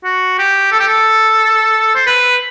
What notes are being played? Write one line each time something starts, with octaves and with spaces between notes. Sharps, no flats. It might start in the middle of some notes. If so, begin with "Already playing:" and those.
F#4
G4
A4
G4
A4
C5
B4